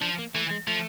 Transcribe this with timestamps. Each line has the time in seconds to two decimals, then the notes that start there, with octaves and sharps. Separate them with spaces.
0.01 F3 D4
0.18 A#3
0.34 E3 A3
0.51 G#3
0.68 F3 A3